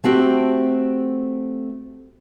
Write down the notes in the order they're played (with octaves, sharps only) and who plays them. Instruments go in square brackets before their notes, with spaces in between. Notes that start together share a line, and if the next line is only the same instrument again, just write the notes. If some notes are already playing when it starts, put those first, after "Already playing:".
[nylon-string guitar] A3 C4 F#4 G4